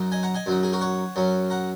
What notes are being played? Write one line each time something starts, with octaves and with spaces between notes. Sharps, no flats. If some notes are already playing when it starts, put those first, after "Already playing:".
Already playing: F#2 F#3 D#4
D#5 G#5
F#5 A#5
D#5 G#5
F#2 F#3 D#4
G#4
F#4 A#4
C#5 F#5
F#2 F#3 C#4
F#5 A#5